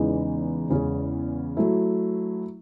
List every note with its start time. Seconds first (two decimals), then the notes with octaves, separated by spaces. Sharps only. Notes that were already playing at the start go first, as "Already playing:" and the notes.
Already playing: E2 C#3 E3 G#3 D#4
0.70 E2 C#3 G#3 C#4 G#4
1.57 F#3 A3 E4